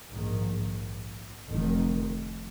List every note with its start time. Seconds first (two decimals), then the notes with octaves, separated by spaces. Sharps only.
0.11 A#1 G#2 D#3
1.48 F1 F2 D#3